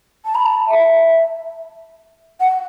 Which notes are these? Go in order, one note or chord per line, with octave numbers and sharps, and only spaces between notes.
A5
B5
A5
E5
F#5